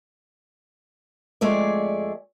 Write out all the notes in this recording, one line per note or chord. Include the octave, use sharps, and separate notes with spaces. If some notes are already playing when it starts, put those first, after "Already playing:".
F2 G#3 A3 G#4 D5